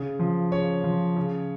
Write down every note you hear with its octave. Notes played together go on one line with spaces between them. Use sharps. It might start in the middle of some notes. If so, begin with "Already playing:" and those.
Already playing: C#3
F3
C#3 C#5
F3
C#3